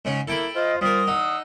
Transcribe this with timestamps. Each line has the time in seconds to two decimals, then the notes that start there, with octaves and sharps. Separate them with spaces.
0.05 G#2 C#3 C#4
0.28 A#3 E4 A4 G5 B5
0.56 F4 C5 D#5
0.81 G3 F4 A#4 C5 D#6
1.07 D#4 F#5 E6